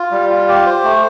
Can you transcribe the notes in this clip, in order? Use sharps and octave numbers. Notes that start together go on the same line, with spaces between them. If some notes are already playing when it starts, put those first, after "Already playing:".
Already playing: F4
G3
F4
G4
C5
A3